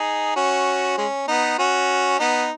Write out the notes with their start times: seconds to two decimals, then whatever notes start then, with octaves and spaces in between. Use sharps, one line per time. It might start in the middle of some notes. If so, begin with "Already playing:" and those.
Already playing: D#4 G#4
0.36 C#4 F#4
0.98 G#3 C#4
1.28 B3 D#4
1.59 C#4 F#4
2.19 B3 D#4